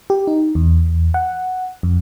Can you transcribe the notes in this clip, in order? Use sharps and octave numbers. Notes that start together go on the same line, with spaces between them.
G4
D#4
E2
F#5
F2